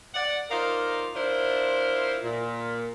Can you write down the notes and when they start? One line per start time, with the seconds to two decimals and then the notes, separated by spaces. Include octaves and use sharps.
0.15 D5 F#5
0.50 D#4 F4 A#4 C5 D5 F5
1.15 D4 E4 F4 A#4 C5
2.24 A#2